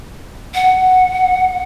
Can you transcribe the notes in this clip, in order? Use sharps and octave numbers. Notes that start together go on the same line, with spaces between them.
F#5